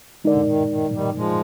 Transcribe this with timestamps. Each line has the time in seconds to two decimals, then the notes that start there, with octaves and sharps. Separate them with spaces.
0.24 D3 G#3 D#4 A#4 D5
0.47 D#3
0.70 D#3
0.94 D#3 G3
1.16 F3 G#3